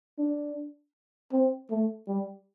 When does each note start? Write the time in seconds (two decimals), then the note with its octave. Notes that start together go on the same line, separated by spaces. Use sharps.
0.18 D4
1.32 C4
1.70 A3
2.08 G3